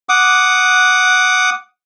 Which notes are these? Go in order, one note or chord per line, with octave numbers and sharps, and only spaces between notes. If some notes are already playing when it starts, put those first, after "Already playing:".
F#5 D6 D#6